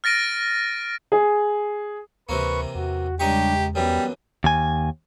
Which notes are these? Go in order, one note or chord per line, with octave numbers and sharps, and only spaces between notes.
F6 A6 A#6 D7 D#7
G#4
D2 C3 E3 A#3 B4 C#6
E2 F#4
C#2 G3 D4 D#4 G4 C#6
F#2 E3 G3 B3
D#2 G#5